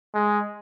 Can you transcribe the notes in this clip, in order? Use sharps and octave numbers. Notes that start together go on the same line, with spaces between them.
G#3